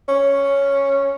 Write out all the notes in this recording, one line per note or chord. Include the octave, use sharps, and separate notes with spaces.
C#4